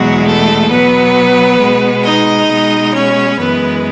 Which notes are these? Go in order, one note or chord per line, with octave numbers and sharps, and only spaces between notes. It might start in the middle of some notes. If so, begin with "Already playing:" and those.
Already playing: E2 B2 F#3 G#3 F#4
A3 A4
B2 F#3 B3 B4
B2 G#3
D#4 D#5
B2 G#3
C#4 C#5
F#2 E3 G#3 B3 B4